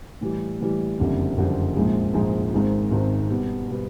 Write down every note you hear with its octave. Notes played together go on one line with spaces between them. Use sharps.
A2 E3 G3
A2 E3 G3
F#1 F2 D3 G3 C4
F#1 F2 D3 G3 C4
A#1 G#2 F3 G#3
A#1 G#2 F3 G#3
G#1 G#2 D#3 G#3 C4
G#1 G#2 D#3 G#3 C4
B2 G3 B3
B2 G3 B3